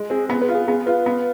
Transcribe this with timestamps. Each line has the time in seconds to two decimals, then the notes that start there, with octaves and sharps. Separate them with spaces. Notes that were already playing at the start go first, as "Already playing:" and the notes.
Already playing: G#3
0.10 C4 G#4
0.29 B3 G#4
0.42 B4
0.48 F4
0.55 G#4
0.67 B3 G#4
0.86 F4 B4
1.06 B3